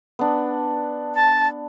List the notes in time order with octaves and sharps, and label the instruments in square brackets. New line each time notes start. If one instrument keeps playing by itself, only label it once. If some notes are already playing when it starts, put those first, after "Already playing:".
[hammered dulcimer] B3 D4
[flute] A5